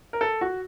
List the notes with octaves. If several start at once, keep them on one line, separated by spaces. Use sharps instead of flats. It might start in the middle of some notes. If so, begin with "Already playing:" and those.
A#4
A4
F#4